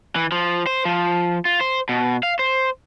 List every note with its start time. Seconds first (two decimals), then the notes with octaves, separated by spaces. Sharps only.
0.16 E3
0.32 F3
0.67 C5
0.85 F3
1.45 F4
1.61 C5
1.89 B2
2.23 F5
2.39 C5